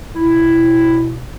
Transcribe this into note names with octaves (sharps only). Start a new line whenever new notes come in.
B2 E4